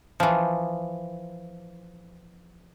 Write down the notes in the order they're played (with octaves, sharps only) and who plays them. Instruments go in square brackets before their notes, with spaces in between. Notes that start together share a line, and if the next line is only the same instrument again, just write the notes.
[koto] E3 F3